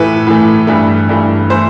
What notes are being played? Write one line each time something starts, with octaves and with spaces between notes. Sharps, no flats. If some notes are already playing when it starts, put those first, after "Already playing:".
Already playing: A2 E3 A3 B4
A2 E3 A3
G2 E3 A3
G2 E3 A3
E3 A3 C5